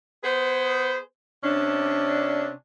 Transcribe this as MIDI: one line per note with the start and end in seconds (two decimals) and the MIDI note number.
0.24 0.97 59
0.24 0.97 68
0.24 0.97 71
0.24 0.97 72
1.43 2.51 48
1.43 2.51 61
1.43 2.51 62